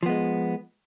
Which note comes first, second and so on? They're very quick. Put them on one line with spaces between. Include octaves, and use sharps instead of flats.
F3 B3 G#3